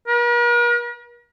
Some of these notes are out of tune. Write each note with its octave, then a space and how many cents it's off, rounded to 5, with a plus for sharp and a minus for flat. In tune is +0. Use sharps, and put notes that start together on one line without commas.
A#4 +45